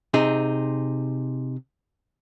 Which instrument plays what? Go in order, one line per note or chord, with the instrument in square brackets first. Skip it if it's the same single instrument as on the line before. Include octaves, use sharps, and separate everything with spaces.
[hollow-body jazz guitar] C3 D#4 G#4